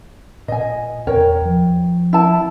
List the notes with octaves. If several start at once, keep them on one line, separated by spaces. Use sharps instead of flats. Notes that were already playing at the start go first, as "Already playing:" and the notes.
A#2 D#5 G#5
E2 A#4 C#5 G5
F3
E4 A5